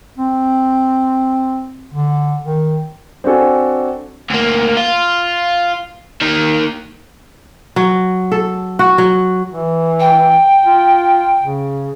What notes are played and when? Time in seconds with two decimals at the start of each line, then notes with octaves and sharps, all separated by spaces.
0.18 C4
1.93 D3
2.43 D#3
3.24 C4 D4 F#4 A4 G#5
4.30 D2 A#3
4.77 F4
6.21 D#3 A#3
7.76 F#3
8.32 A4
8.79 F#4
8.98 F#3
9.50 E3
9.99 G5
10.65 F4
11.42 C#3